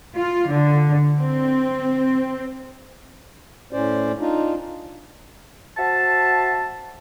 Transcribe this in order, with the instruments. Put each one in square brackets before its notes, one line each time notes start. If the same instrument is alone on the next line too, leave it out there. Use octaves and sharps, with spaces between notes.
[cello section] F4
D3
C4
[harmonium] A2 C#4 C5 D5
D4 D#4 F4
[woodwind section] F#4 C5 E5 A5